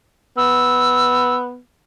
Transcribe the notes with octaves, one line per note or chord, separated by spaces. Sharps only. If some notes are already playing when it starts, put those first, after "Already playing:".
B3 E6